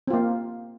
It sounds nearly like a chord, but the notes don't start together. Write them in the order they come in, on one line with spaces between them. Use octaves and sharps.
C4 F4 A#3